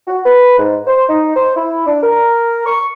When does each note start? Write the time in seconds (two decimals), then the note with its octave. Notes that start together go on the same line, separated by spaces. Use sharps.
0.08 F#4
0.26 B4
0.59 G#2
0.87 C5
1.09 D#4
1.36 C5
1.56 E4
1.87 D4
2.03 A#4
2.66 C#6